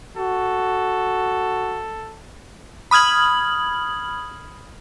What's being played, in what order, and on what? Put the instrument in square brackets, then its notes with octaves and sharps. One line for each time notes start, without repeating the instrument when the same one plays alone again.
[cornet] F#4 [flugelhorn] A4
[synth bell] B5 D#6 F6 G#6 F#7